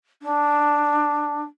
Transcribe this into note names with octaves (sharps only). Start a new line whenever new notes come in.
D4